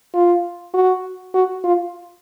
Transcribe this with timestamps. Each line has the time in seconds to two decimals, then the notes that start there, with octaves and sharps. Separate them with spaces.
0.14 F4
0.74 F#4
1.34 F#4
1.64 F4